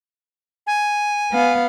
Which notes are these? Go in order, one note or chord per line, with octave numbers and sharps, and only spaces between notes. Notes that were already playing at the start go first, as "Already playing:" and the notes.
G#5
B3 F5